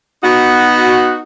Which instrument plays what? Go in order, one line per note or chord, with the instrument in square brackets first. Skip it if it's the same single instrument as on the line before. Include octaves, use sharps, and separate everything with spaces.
[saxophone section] B3 D#4 F#4